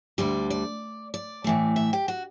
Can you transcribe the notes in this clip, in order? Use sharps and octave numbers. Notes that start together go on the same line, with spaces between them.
D2 D3 G3 D5
D5
D5
A2 E3 A3
E5
G4
F#4